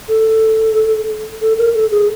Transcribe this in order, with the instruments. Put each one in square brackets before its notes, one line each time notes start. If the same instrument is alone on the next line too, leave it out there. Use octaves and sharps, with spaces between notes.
[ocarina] A4
A4
A#4
A4
G#4